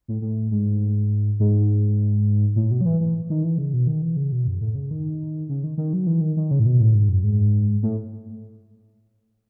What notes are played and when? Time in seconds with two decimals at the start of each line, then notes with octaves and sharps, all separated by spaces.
0.08 A2
0.22 A2
0.51 G#2
1.40 G#2
2.56 A2
2.71 B2
2.81 F#3
2.85 E3
3.01 E3
3.30 D#3
3.44 E3
3.58 C#3
3.73 B2
3.87 D#3
4.02 E3
4.17 C#3
4.32 B2
4.47 F#2
4.61 A2
4.75 C#3
4.91 D#3
5.49 C#3
5.64 D#3
5.78 D#3
5.93 F#3
6.07 E3
6.21 D#3
6.37 D#3
6.51 C#3
6.60 A2
6.66 B2
6.80 A2
6.94 G#2
7.09 F#2
7.24 G#2
7.83 A2